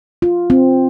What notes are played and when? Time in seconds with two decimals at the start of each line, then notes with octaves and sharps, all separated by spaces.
0.22 F4
0.50 C4